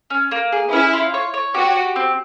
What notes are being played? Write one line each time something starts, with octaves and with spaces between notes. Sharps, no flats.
C#4
A#3
G#4
C#4 E4
F4
C#5
C#5
F#4 G4
G4
C4